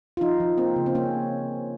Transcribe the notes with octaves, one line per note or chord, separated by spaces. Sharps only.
F4
F3 D#4
F3
A#3 C4
C#3
C4
A#3 C#4